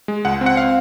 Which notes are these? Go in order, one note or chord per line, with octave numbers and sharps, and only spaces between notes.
G#3
C#2 F#5
C4
F#5
F5